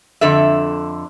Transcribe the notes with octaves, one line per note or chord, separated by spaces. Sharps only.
F2 D3 A4 E5